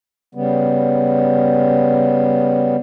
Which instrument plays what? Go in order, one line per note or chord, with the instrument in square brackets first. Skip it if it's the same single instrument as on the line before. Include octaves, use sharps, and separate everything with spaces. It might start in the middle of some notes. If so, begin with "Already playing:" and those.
[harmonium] C#3 G3 B3